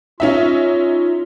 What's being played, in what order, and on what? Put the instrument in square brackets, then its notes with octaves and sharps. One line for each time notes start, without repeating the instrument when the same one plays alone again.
[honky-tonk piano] C#4 D#4 E5 [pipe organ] F4